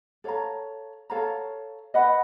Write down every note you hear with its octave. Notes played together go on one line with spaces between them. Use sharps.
A4 C#5 F5 A#5
A4 C#5 F5 A#5
B4 D#5 F#5 B5